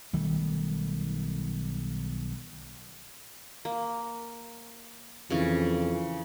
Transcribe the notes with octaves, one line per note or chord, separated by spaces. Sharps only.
B1 D#3 G3 A3
A#3
F2 C#3 E3